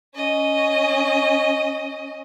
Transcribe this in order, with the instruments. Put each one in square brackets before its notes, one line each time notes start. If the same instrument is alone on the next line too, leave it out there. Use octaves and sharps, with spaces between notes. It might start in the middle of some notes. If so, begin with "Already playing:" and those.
[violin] C#4 D#5